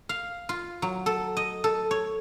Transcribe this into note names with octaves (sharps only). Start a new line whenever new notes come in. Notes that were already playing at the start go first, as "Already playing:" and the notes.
F5
F4
F#3
A4
D#5
A4
C#5